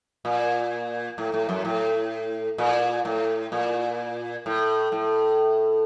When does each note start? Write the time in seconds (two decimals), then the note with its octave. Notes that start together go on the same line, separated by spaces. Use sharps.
0.25 A#2
1.18 A2
1.34 A2
1.49 F#2
1.65 A2
2.58 A#2
3.05 A2
3.52 A#2
4.46 A2
4.92 A2